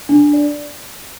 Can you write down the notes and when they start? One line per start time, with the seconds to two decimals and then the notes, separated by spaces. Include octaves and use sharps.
0.09 D4
0.33 D5